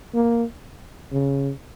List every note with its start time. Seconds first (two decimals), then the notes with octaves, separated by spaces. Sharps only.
0.14 A#3
1.12 C#3